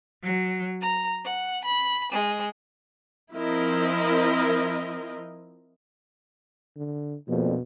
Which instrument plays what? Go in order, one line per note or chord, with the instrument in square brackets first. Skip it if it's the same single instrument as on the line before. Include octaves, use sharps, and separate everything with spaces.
[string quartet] F#3
A#5
F#5
B5
G#3
[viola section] F3 C4 E4 A#4 D#5
[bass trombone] D3
[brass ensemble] A#1 F2 [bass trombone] B2